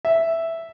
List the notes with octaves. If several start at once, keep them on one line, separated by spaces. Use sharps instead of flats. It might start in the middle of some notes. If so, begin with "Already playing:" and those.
E5